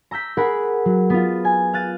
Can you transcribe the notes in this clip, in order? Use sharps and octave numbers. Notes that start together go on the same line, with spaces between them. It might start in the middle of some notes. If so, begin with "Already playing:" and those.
A#5 E6 G6 B6
G#4 A#4 F#5 G#5 B5
F#3
B3 F4
G#5
F5 F#6 A6 D#7